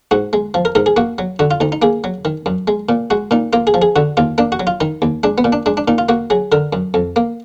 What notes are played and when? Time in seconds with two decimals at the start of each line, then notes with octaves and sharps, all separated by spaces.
0.11 G#2 F#4
0.33 G#3
0.54 F3
0.65 A#4
0.75 G#2 A#4
0.86 G#4
0.96 A#3 F#4
1.18 F#3
1.39 D3 F#4
1.51 F4
1.60 D2 D#4
1.72 D#4
1.82 A#3 G#4
2.04 F#3
2.25 D#3
2.46 F#2
2.68 G#3
2.89 A#2
3.10 G#3 F#4
3.31 A#2 D#4
3.53 A#3 F4
3.67 G#4
3.74 F3
3.82 G#4
3.96 D3 F#4
4.17 D#2 F4
4.38 A#3 D4
4.52 F#4
4.60 F#3
4.67 F4
4.80 D#3 D#4
5.02 D#2
5.23 G#3 D4
5.38 B3
5.44 A#2
5.52 D4
5.66 G#3 D4
5.77 D4
5.88 A#2 D#4
5.98 F4
6.09 A#3 F#4
6.30 F#3 G#4
6.52 D3 A#4
6.73 F#2
6.94 F2
7.16 A#3